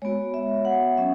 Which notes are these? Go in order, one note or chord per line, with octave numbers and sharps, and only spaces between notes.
G#3 B3 F#4 C#5
E5
F#5
F#3 C#4 E5